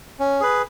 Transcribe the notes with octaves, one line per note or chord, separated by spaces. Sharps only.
C#4
G#4 B4